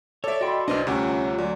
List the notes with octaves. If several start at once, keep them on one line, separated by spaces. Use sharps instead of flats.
A4 C#5 D5 E5
F#4 D#5 G5 B5 C6
C2 C4 D4 B4 D5 D#5 F6
D2 C3 G3 C#4 F4 C#5 F#5 A#5
D2 F#3 F#4 D5